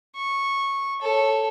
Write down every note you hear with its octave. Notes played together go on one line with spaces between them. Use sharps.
C#6
A4 C#5